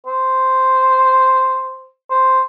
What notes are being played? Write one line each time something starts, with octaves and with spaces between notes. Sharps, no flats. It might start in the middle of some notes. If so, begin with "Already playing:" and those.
C5
C5